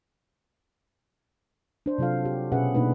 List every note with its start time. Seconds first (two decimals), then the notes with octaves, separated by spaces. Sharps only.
1.86 D4 C5
1.98 C3 F#3 F4 A4 F5
2.25 F#4 G4
2.52 B2 C#4 G#4 B4 E5 F#5
2.75 B2 A#3 B3 D4 D#4 B4